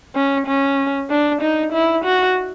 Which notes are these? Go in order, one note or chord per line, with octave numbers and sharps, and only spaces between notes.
C#4
C#4
D4
D#4
E4
F#4